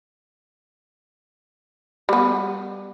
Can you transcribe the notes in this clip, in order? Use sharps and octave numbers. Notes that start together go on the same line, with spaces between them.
G3 B3